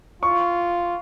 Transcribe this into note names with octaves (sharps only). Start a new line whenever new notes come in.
F4 C#6